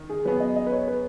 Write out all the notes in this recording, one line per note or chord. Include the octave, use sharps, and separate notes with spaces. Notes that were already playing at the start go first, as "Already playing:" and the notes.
Already playing: D#3
G#4
F#3 B3 G#4 B4
D#5
D#5
B4
C#5
B4